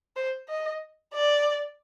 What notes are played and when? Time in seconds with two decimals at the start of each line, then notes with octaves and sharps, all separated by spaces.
0.16 C5
0.49 D#5
1.14 D5